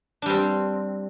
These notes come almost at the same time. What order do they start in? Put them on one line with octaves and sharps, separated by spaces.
D4 G3 C4